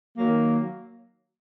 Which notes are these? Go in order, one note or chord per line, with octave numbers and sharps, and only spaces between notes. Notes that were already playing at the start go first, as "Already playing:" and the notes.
D#3 F#3 A#3